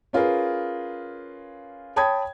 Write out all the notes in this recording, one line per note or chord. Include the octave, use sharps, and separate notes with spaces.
C#4 F4 G#4 A#4 B4
C#5 G5 A5 B5 D#6 G#6